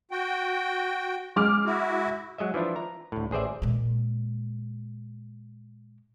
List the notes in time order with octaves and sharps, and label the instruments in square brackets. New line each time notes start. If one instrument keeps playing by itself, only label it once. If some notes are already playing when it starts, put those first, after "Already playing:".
[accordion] F#4 G5
[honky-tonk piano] G#3 D6 F6
[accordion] E4 F#4
[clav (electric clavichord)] F#3 G#3 D#5 E5
E3 F3 D4 E4 F4
A#5
D2 A2
A1 G#4 C5 D5 E5
[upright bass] A#2 G#3